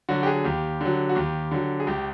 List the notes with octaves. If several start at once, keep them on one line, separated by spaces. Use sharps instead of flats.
D3 F#3 F#4
G4
G#4
D#2 G4
D3 F#3
F#4
D#2 G4
D3 F#3
G#4
C#2 G4